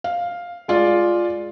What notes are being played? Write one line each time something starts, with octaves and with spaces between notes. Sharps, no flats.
F5
G#3 F4 D5